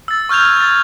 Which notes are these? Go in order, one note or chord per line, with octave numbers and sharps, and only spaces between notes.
E6 A6
C#6 F6 G6 G#6 F7
G#6 A6